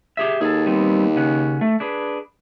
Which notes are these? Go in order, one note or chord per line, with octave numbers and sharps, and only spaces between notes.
G4 G#4 E5
D#2 G#4 A4
G3 B3 C4
C#3 C#4 F#5
A3
D4 G#4 B4